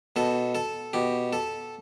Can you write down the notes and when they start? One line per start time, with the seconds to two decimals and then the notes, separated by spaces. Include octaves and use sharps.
0.16 B2 A4
0.55 A4
0.93 B2 G4
1.33 A4